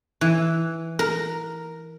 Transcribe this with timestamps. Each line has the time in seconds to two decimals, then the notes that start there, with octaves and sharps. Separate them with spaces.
0.21 E3
0.99 A#4